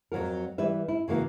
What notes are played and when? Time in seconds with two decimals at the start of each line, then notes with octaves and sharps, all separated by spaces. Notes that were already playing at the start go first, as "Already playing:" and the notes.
0.12 F2 F#3 F#4 A#4
0.58 E3 G3 B4 E5
0.88 E4
1.08 C#3 E3 A#3 F#4